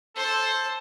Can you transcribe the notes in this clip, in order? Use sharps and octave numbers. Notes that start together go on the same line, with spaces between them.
A4 C5 A5